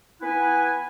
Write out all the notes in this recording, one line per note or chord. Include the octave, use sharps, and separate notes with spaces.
B3 E4 B4 F#5 G#5